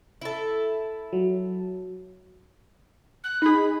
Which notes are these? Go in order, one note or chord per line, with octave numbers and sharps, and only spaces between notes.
E4 A4
F#3
F#6
D#4 G#4 B5